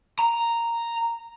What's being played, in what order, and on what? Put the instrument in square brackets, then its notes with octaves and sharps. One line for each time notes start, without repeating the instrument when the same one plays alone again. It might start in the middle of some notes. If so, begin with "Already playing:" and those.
[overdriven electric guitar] A#5